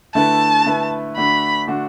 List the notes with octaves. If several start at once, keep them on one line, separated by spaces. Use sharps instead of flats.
D3 A3 E4 B4 A5
D3 A3 E4 B4
D3 A3 D4 F#4 B5
D3 A3 D4 F#4